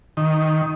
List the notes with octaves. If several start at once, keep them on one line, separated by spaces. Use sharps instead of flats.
D#3